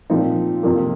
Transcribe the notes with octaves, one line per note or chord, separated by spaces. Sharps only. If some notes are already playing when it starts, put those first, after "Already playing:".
A#2 F3 C4 D#4
F2 C3 F3 A#3